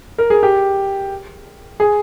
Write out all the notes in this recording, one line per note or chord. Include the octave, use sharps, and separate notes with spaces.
A#4
G#4
G4
G#4